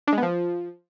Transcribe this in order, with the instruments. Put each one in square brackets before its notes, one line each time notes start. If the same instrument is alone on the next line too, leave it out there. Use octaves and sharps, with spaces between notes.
[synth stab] D4
G#3
B3
F3